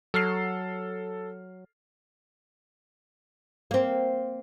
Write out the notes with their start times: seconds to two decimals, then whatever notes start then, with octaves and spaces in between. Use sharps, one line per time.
0.14 F#3 A4 F6 C7
3.71 A#3 C4